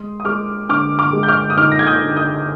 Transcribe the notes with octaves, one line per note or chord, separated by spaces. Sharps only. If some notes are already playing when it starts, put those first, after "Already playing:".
Already playing: G#3 C6 D#6
D#6
G#3 D6 F6
D3 D6 F6
D6 F6
G#3
G6
D6 F6
D#6
D#4 D6 F6
A#6
G#6
D#6 G6
D3
D#6 G6